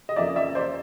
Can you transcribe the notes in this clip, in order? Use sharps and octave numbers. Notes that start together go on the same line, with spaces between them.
D#5
F2 C#3 F3 A#3 D5 E5
D5 E5
C5 D5